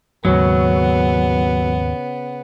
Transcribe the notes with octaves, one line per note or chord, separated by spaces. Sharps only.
D#2 G#2 C#3 F#3 B3